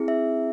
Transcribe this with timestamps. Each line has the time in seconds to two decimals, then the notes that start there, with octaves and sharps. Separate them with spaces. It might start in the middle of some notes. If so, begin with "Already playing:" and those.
Already playing: C4 E4 G#4
0.08 E5